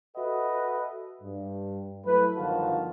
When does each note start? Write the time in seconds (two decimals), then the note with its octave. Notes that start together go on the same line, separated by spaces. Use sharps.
0.16 F#4 A4 B4 D#5 E5 F#5
1.22 G2
2.06 F#3 A3 E4 B4
2.37 G1 D#3 F3 F#4 F5 A5